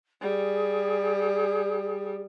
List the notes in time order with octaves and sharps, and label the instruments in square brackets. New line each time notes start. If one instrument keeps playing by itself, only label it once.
[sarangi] G3 [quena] G#4